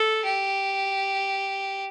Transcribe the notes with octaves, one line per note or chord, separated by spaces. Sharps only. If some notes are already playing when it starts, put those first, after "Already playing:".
Already playing: A4
G4